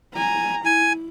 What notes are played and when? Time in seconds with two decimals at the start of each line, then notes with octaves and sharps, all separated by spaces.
0.14 G#5 A#5
0.65 E4 G#5